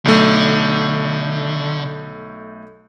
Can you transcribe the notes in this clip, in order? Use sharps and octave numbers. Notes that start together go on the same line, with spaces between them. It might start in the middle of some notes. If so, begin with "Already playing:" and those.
B1 D3 A3